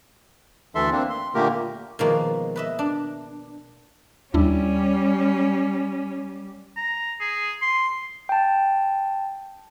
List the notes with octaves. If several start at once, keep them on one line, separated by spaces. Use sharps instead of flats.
D2 E3 A4 E5 C6
A#3 C4 D4
C6
A#2 D3 A3 A#3 G4 A#4
B2 D#3 F3 G#3 A#3
B4 D#5 E5
D4
D#2 G3 C#4 D4 E4
A#5
G#4
C6
G5 A5